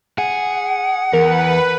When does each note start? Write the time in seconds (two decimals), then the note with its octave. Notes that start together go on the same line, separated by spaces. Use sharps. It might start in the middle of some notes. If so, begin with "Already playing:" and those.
0.18 G#4 F#5
1.13 E2 A#4 B4